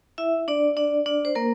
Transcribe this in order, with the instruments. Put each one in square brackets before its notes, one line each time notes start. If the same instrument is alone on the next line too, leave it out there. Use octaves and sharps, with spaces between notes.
[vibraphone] E4 E5
D4 D5
D4 D5
D4 D5
C5
A#3 A#4